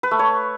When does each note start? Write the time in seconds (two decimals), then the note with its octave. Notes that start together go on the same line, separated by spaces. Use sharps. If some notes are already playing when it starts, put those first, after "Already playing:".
0.03 B4
0.11 A3
0.19 C#5